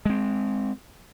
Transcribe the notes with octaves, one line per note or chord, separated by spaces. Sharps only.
G#3 C4